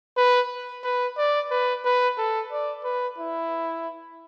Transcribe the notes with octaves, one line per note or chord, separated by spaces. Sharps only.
B4
B4
D5
B4
B4
A4
D5
B4
E4